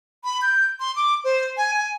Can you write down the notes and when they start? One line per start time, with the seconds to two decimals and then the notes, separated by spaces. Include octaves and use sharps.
0.24 B5
0.42 G6
0.80 C6
0.96 D6
1.24 C5
1.57 G#5
1.74 G#5